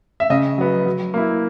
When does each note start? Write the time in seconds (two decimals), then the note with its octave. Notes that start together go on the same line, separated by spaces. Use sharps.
0.20 E5
0.30 C#3 D#5
0.58 F#3 B3
0.86 F#3
1.14 A#3 E4